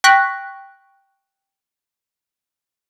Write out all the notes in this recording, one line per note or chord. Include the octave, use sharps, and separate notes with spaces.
G5 C#6 F#6 A#6 B6